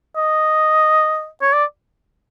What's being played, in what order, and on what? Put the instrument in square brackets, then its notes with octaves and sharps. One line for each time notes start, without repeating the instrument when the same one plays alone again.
[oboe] D#5
C#5
D5